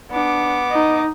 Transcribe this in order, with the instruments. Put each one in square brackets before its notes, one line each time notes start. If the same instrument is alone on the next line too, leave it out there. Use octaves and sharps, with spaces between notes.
[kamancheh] B3 D6 [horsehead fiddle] D4
[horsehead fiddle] D#4 D#5